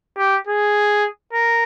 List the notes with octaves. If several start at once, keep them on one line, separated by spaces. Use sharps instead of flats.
G4
G#4
A#4